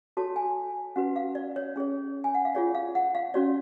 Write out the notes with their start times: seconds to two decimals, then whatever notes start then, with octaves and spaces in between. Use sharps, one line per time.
0.17 F#4 A4 C#5 A5
0.36 G#5
0.96 C#4 F#4 B4 F#5
1.16 F5
1.35 D5
1.56 C#5
1.76 C#4 G#4 C#5
2.24 G#5
2.34 F#5
2.45 F5
2.55 F4 G#4 C#5 D5
2.75 F5
2.95 F#5
3.15 F5
3.34 C#4 F#4 C#5 D5